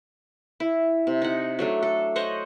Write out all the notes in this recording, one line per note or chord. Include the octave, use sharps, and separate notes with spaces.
E4
C3
D#4 F#5
F#3 A3 D4
A4
C5 C#5 D#5 F#5